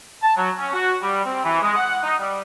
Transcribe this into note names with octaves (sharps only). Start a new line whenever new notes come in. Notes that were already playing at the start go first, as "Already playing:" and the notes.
A5
F#3
C#4
F#4
G3
C4
E3
G#3
F#5
D#4
G3